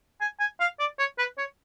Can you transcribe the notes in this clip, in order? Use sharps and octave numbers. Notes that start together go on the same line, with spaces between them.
G#5
G#5
F5
D5
C#5
B4
C#5